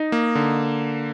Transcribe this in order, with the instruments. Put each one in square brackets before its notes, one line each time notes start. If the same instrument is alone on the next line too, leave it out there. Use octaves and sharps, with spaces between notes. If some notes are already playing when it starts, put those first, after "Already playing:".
Already playing: [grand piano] D#4
[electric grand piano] A#3
D3